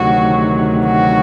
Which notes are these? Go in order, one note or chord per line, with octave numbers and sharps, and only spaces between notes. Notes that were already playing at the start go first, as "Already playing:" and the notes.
Already playing: D2 C3 D#3 F#3 F#4
F#4